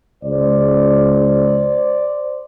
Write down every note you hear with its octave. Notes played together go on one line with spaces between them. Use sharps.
C#2 C5 D5